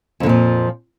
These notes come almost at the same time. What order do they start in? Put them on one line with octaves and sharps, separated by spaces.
F2 D3 A#2 F3